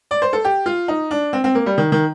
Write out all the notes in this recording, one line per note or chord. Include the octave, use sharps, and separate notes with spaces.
D5
C5
A4
G4
F4
D#4
D4
C4
C4
A#3
G3
D#3
D#3